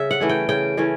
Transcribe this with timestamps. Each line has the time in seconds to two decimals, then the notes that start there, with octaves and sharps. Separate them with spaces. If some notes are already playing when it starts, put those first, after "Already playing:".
Already playing: C#3 E5
0.11 F#5
0.20 E3 A3 C#4
0.29 G5
0.49 C#3 G5
0.77 E3 A3 C#4